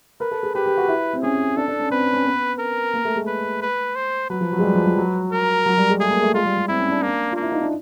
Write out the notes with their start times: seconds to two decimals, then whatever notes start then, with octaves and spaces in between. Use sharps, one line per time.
0.20 A#4 B4
0.31 A4
0.43 G#4
0.55 G4 B4
0.66 G4
0.77 F#4
0.88 E4
1.13 C4
1.23 C#4 G#4
1.56 D4 A4
1.68 D4
1.80 C#4
1.90 C4 B4
2.13 C#4
2.25 B3
2.59 A#4
2.94 A#3
3.05 A3
3.16 G#3
3.27 B4
3.61 B4
3.95 C5
4.30 F#3 B4
4.41 F3
4.52 F#3
4.59 G#3
4.64 G3
4.75 F3
4.86 F3
4.98 F#3
5.32 A#4
5.66 F#3
5.78 G3
5.89 G#3
6.00 A3 G#4
6.11 A#3
6.22 A3
6.34 G#3 F4
6.45 G3
6.57 G3
6.68 C4 E4
6.79 C#4
6.91 D4
7.02 A#3
7.32 A#3 F4
7.42 E4
7.52 D#4
7.61 D4